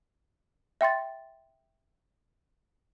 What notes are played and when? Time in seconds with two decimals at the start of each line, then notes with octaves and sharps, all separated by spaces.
0.81 E5 G5 C6 A6